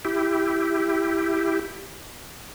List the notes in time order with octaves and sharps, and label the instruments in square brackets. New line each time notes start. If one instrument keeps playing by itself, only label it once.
[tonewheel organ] E4 G4